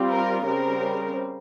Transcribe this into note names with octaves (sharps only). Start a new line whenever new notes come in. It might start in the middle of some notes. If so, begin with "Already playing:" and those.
Already playing: G3 C4 F4
A#4
C#3 G3 C4 A#4